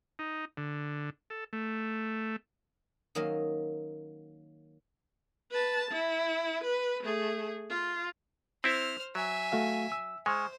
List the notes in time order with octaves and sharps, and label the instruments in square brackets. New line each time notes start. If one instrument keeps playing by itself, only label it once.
[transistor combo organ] D#4
D3
A4
A3
[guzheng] D#3 F#3 A#3 C#4 D#5 F5
[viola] B4 A5
E4
B4
A3 G#4
F4
[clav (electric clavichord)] C4 E4 E5 [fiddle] C5 F6
[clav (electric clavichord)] F#3 [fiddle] E5 G#5
[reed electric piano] A3 F#4 F5
E6
[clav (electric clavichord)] G#3 [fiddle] C5 [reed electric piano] G#5 C#6 F6